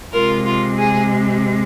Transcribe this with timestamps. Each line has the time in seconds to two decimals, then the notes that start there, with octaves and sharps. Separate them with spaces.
0.13 C3 G#3 F4 A#4
0.45 F4
0.78 G#4